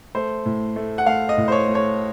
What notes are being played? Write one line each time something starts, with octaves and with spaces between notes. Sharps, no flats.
A3 C5
A2
A3
F#5
A3 F5
D#5
A2
C5
C#5
A3
C#5